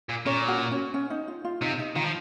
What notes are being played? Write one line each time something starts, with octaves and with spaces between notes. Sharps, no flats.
A#2
A#2 C#4 C#5
F#4
C#4
C#4
D#4
F4
F4
C3 D#4
D#4
D#3 F4
F3